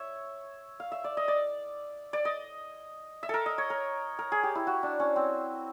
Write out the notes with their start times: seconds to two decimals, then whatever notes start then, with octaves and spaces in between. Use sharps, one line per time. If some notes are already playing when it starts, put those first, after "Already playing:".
Already playing: C#5 E5
0.80 F5
0.92 E5
1.04 D5
1.17 D#5
1.28 D5
2.13 D5
2.25 D#5
3.23 E5
3.29 A4 A#4
3.46 D#5
3.58 C#5
3.70 A#4
4.19 A#4
4.32 G#4
4.43 G4
4.55 E4
4.67 F#4
4.83 D4
5.00 C#4
5.16 C4